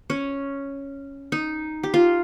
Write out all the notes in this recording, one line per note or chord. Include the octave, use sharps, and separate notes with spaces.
C#4
D#4
G4
F4